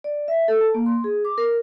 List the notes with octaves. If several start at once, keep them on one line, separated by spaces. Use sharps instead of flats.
D5
E5
A4
A5
A#3
C6
G#4
D6
A#4